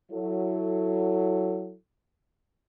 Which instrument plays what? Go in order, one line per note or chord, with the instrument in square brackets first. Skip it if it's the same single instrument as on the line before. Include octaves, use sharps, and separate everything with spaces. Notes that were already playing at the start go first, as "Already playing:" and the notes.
[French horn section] F#3 E4 A4